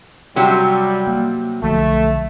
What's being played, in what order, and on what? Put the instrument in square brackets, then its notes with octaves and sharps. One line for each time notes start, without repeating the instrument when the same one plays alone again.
[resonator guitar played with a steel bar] C3 F#3 [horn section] G3 [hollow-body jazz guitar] G4
[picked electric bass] A#3
[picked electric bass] B1 D3 F3 [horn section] A3